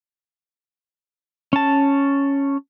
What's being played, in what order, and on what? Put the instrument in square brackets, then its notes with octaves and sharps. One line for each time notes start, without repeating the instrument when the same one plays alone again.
[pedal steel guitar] C#4 A5